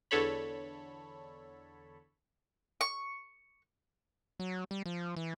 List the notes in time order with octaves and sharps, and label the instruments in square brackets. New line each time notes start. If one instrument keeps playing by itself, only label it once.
[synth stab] E2 D3 A4 C#5 B5
[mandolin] C#6
[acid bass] F#3
G3
F3
E3